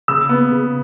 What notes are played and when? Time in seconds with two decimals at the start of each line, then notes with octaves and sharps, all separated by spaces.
0.08 C#3 E6
0.29 B3
0.50 C#3